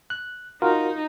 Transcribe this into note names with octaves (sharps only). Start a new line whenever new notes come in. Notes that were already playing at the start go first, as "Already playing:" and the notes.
F#6
D#4 F4 F#4 A#4